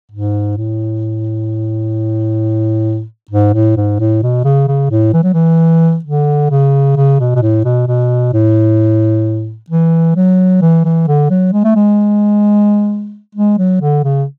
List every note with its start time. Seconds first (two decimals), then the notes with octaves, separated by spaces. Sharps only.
0.11 G#2
0.57 A2
3.31 G#2
3.54 A2
3.77 G#2
4.00 A2
4.23 B2
4.45 C#3
4.68 C#3
4.91 A2
5.13 E3
5.24 F#3
5.34 E3
6.05 D3
6.51 C#3
6.96 C#3
7.20 B2
7.35 B2
7.42 A2
7.65 B2
7.88 B2
8.33 A2
9.70 E3
10.16 F#3
10.62 E3
10.85 E3
11.08 D3
11.30 F#3
11.53 G#3
11.64 A3
11.76 G#3
13.35 G#3
13.59 F#3
13.81 D3
14.04 C#3